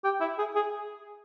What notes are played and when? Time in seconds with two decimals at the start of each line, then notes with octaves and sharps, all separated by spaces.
0.04 G4
0.21 E4
0.38 G#4
0.55 G#4